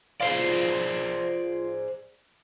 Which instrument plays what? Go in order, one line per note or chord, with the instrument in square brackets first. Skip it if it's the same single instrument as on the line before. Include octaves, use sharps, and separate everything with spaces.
[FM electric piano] F4 C6 [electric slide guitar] G#4 C5 D5